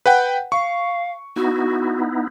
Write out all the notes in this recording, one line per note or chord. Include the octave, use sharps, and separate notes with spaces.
B4 F#5 G5
F5 C#6
B3 D#4 E4 F#4